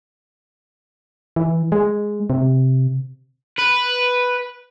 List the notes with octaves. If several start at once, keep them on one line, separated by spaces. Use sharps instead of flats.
E3
G#3
C3
B4